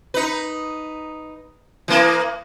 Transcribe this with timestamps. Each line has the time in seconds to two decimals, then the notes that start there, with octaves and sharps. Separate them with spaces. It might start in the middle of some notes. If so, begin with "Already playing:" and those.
0.14 D#4 B4
1.88 E3 A#3